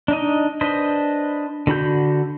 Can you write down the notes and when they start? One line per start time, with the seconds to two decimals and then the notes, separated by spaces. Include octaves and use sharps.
0.08 D4 D#4 D#5
0.61 D4 B4 C5 D#5
1.67 D3 F#4 B5 G6